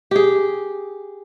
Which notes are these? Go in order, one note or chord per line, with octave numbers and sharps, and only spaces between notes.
G4 G#4